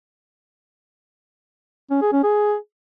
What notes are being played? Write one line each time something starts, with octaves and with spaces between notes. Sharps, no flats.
C#4
G#4
C#4
G#4